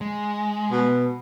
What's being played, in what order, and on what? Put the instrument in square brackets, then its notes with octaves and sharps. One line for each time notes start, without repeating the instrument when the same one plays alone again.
[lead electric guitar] G#3
[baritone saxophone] B2